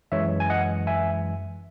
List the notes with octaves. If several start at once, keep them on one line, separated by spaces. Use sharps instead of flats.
F#2 E3 G#3 C#5 E5
G#5
D#5 F#5
E5 G#5